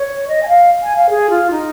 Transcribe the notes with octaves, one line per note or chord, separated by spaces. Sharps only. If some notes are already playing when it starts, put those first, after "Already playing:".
Already playing: C#5
D#5
G#5
F5
G#5
F5
G#4
F4
D#4